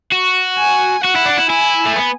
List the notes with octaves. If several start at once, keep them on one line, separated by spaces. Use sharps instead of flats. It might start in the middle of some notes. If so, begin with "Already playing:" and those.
F#4
G#5
F#4 F#5
E4
D4
E4
E4 G#5
A3
B3